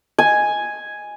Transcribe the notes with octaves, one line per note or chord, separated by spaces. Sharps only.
G#5